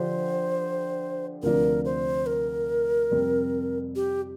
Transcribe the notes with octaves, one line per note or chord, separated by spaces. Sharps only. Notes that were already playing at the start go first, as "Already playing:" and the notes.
Already playing: D3 F3 D4 G4 C5
D2 C3 F3 D4 A#4
C5
A#4
F2 C3 G3 C4
G4